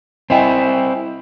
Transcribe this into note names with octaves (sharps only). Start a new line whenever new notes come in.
C4 E4 D#5 G5 G#5